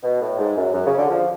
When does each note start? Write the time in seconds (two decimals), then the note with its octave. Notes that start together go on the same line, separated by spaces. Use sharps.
0.03 B2
0.21 A2
0.39 G#2
0.56 F#2
0.74 F#2
0.86 C#3
0.97 D3
1.09 F3